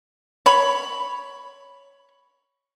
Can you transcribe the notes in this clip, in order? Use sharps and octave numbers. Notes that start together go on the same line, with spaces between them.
C#5 B5